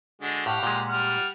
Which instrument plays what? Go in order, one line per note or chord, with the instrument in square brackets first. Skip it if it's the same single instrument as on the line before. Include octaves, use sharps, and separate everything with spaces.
[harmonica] D3 G#3 F#4
[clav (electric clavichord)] A2 [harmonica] G4 F5 F#5
[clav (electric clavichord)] A#2 G#3
[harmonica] G3 F#5 F6